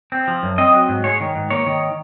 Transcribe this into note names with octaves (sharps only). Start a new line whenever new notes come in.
C4
F3
F#2
C4 D#5
F#3
G#2
G#3 C#5
D#3
G#2
A#3 C#5
D#3